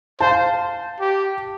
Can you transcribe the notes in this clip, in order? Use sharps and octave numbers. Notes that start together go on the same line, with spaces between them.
C5 F5 A5
G4